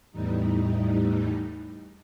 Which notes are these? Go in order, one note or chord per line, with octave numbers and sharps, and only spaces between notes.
E2 A2 E3 G3 D#4